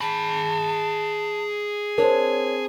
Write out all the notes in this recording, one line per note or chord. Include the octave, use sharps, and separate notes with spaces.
G#4 A5 B5
C4 D4 A#4 C#5